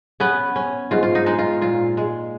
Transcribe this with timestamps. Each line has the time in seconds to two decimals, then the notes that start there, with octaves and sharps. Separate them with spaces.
0.20 B3 C#4 B4
0.56 C#4
0.91 G#2 F4
1.03 F4
1.15 D#4
1.26 G#3 D#4
1.39 F4
1.62 A#2 F4
1.97 G#3